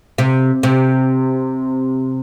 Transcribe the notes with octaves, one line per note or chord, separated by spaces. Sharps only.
C3
C3